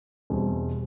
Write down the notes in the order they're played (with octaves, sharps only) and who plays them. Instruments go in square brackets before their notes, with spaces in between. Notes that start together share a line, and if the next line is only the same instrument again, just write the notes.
[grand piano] E2 B2 G3 C4